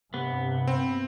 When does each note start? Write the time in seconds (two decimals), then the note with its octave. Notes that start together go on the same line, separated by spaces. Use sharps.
0.14 G2 C3 B3
0.67 C4